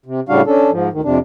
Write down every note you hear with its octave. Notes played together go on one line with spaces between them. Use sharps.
C3
A2 C#3 G3 D4 F#4 F5
C#4 D4 A4
G#2 F3
D2 D#3
F2 C3 D4